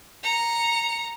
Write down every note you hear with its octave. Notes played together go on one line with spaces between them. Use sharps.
A#5 C#7